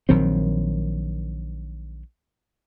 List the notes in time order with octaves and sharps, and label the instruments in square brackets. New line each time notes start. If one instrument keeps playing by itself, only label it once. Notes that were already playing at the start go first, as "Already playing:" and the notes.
[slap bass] A#1 D#3 F#3 C4